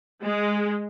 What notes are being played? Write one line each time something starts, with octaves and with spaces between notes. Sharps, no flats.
G#3